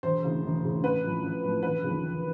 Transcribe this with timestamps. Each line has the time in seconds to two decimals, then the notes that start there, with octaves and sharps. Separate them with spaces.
0.03 E1 C5
0.23 D2 C#3 E3
0.44 E1
0.63 D2 C#3 E3
0.83 A1 B4
1.04 A2 F3
1.23 A1
1.43 A2 F3
1.63 E1 B4
1.83 D#2 C#3 F3
2.03 E1